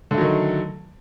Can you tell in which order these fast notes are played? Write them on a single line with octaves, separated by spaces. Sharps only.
D3 A3 F#3 D#3